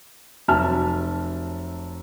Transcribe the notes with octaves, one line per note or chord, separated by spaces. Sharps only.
F1 F#3 E5 A5 F6